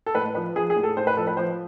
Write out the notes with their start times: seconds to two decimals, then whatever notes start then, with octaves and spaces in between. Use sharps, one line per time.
0.06 A4
0.15 A2 B4
0.35 F3 B4
0.55 F3 G#4
0.70 G#4
0.76 A2
0.83 A4
0.97 A2 C5
1.07 B4
1.17 F3 A4
1.27 B4
1.37 F3 C5